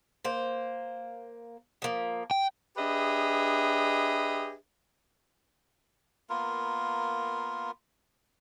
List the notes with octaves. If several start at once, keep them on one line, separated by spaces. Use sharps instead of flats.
A#3 C5
F3 A#3
G5
D4 G4 G#4 B4 D#5 E5
A#3 B3 F4 A#4